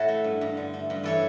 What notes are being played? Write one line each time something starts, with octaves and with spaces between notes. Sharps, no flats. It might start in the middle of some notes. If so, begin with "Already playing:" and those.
Already playing: A2 E4 F#4 A4
A3
G2
G2
D3
A3
G2
E3 A4 C#5